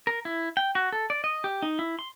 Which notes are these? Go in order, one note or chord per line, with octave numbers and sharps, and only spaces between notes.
A#4
E4
G5
F#4
A4
D5
D#5
G4
D#4
E4
C6